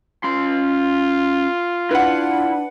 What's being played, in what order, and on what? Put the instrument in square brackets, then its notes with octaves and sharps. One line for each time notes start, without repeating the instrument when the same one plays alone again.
[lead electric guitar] C#4 C6 [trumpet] F4
[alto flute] D4 [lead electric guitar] E4 [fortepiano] B4 F#5